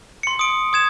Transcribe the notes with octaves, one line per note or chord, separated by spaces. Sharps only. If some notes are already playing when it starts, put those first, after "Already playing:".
C6 C#7
D#6 D7
D#6 G#6 E7